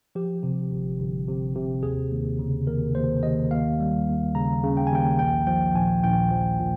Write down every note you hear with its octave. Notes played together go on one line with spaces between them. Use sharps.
F3 G4
C3
G1
G1
C3
C3
D#2 G#4
D#2
C#3
D#2 A#4
D#2 C5
D#2 D#5
D#2 F5
G3
D#2
C#3 A#5
C#3
G5
G#5
D#2 G5
A#1 G5
F3 G5
A#1 G#5
A#1 G5
F3
A#2